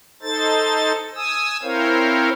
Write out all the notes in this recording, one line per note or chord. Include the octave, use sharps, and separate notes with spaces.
D#4 A4 C5 A6
G#5 D#6 E6
C4 E4 A#4 C5 C#5 F5